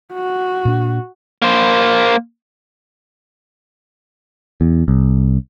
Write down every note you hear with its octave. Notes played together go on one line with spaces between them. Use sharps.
F#4
A#2 D4
A#3 C5
E2
C2